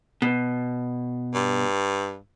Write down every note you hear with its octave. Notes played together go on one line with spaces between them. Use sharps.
B2
G2